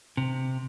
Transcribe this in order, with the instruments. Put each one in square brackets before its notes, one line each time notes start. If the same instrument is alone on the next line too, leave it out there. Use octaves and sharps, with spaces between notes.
[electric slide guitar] C3